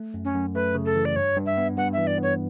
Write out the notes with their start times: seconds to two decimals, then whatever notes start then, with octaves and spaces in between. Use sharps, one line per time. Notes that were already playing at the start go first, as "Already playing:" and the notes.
Already playing: A3
0.14 F#2
0.25 C#4
0.35 F#2
0.55 A3 B4
0.75 C#3
0.85 A4
0.96 E3
1.05 D5
1.16 G2 C#5
1.36 G2
1.46 E5
1.57 B3
1.77 G2 F#5
1.93 E3 E5
2.07 D5
2.18 B3 C#5